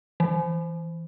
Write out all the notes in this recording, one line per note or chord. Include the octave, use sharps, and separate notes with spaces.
E3